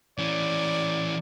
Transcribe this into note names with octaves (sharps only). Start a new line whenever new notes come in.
E3 C#4 D5